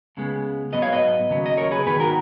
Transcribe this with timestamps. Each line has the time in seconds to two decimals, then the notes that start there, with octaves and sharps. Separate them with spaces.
0.17 C#2 C#3 G#3 B3
0.73 G#2 F#3 B3 B4 D#5
0.82 C#5 F5
0.92 B4 D#5
1.30 D#2 C#3 F#3 B3
1.46 D#5
1.57 A#4 C#5
1.71 G#4 B4
1.86 G#2 D#3 F#3 B3 G#4 B4
2.00 F#4 A#4